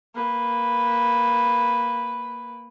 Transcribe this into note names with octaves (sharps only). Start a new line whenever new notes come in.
A#3 B4